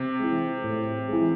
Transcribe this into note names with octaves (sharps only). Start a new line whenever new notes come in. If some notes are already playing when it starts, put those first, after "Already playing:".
Already playing: C3
E3 G#3
A2
E3 G#3